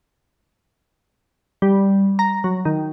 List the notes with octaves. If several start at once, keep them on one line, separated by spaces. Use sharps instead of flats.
G3
A#5
F#3
D#3